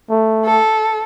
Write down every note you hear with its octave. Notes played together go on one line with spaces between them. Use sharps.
A3
A4